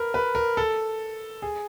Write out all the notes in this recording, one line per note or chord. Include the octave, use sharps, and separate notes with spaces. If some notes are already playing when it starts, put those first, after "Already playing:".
Already playing: A#4 B4
B4
A#4
A4
G#4